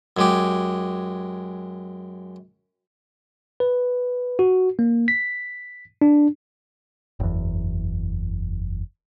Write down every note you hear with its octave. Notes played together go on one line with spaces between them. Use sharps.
F#2 G#3 G4
B4
F#4
A#3
B6
D4
F#1 E2